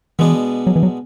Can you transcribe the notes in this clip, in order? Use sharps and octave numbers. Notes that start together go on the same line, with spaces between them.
B2 E3 G#3 B3 D4
F#3
E3
F#3